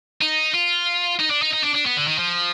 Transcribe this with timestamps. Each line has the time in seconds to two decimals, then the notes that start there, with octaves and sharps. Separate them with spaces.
0.21 D#4
0.54 F4
1.19 D#4
1.30 D4
1.42 D#4
1.54 D#4
1.64 D4
1.75 D4
1.86 B3
1.97 D3
2.08 D#3
2.19 F3